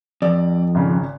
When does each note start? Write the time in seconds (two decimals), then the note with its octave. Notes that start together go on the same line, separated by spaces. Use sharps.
0.22 F2 D5
0.75 G#1 C#3